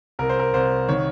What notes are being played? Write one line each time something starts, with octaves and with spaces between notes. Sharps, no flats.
C2 A#4
C5
A#4
C2 C5
D#3 C#5